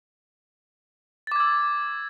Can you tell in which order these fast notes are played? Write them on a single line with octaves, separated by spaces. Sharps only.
A6 D6 G#6 E6